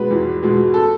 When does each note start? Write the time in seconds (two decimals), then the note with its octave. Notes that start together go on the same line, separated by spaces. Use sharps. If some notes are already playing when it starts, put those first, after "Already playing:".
Already playing: B2 G#3 B4
0.11 E2
0.43 B2 G#3
0.74 A4